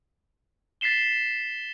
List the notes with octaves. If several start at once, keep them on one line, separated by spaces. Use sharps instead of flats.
A6 B6 C7 E7 G7